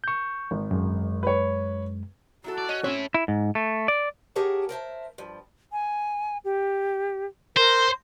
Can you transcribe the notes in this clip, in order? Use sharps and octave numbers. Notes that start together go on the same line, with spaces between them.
C#6 G6
G#1
F#2 G#3
B4 C#5
F#3 E4 F#4 A4
D5
C#4 D#5
C4 C#4 E4 A4 C#5
E4
G#2
A3
D5
G4 G#4 A#4 C#5 F#5 A5
A#4 C5 E5 A5
G2 F3
G#5
G4
A#4 C5